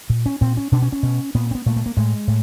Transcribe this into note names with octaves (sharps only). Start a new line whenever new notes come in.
A#2
C#4
A#2 C4
C#4
B2 D4
C#4
C#4
B2
A#2 B3
C4
B3
A#2 A3
A3
A#3
A2 G#3
A2